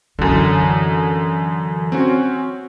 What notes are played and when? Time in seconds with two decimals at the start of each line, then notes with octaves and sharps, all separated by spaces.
0.19 F#2 D3 E3
1.92 C4 C#4 F#4